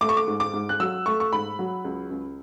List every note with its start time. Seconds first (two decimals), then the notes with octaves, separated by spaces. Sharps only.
0.01 A3 D6
0.09 C#6
0.17 D6
0.27 G#2
0.40 D6
0.54 G#2
0.69 F#6
0.80 F#3 E6
1.06 A3 C#6
1.20 C#6
1.32 G#2 B5
1.59 F#3
1.85 C#2
2.11 C#2